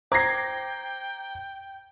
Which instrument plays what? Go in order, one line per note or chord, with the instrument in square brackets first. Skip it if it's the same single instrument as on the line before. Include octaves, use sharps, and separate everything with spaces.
[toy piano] C5 [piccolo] G5 [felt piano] A#5 C7 [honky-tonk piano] D6 G#6 A#6